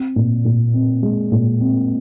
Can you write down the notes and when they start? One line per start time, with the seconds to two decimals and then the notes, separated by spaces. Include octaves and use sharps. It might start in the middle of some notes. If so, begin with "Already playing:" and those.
Already playing: C4
0.16 A#2
0.45 A#2
0.74 C4
1.03 G#3
1.32 A#2
1.60 C4